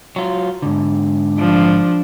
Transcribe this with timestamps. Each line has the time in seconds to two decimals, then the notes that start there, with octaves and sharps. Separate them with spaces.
0.16 F#3 F4
0.62 G#2 D3
1.38 F3 D4